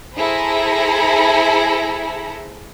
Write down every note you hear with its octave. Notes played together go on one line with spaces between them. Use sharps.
E4 G#4 A4 C5 A#5 B5